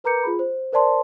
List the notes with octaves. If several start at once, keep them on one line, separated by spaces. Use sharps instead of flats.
A#4 B4 A#5 D6 G6 C#7
F4 G#4 B5
C5
A#4 C5 D5 A5 C6